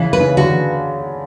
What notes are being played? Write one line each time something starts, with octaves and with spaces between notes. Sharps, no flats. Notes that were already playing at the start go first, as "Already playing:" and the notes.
Already playing: C#3 E3
B4
C#3
D3 F#4